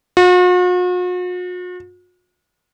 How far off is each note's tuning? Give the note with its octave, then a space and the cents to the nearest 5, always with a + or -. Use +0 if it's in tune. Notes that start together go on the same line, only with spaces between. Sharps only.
F#4 -45